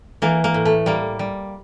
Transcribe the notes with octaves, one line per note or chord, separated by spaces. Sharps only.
E3 A#3
A#3
A2
A3
G3 A#3
G3